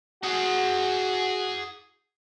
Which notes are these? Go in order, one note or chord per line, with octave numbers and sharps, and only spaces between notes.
F#4 G#4 F#5